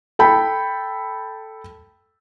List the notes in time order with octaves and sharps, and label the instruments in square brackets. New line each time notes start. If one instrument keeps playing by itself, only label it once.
[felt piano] A4 G5 B5